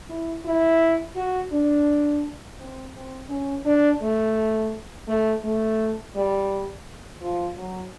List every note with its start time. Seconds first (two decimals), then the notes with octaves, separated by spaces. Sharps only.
0.09 E4
0.45 E4
1.16 F#4
1.52 D4
2.59 C4
2.94 C4
3.29 C#4
3.65 D4
4.01 A3
5.07 A3
5.44 A3
6.15 G3
7.21 F3
7.57 F#3